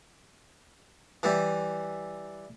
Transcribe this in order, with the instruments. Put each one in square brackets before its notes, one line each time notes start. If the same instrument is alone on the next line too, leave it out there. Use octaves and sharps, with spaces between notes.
[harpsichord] E3 G3